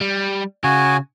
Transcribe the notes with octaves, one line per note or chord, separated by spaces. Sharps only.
G3
C#3 F#4 G#5